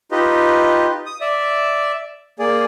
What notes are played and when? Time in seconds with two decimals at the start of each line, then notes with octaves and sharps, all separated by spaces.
0.11 D#4 F4 G4 B4 D#5
1.06 D#6
1.21 D5 E5
2.39 A#3 G#4 D5